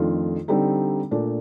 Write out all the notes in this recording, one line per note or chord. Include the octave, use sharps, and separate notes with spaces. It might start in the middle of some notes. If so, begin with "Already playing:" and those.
Already playing: F2 D#3 A3 D4 F4
D3 G3 C4 D#4 A4
A#2 A3 D4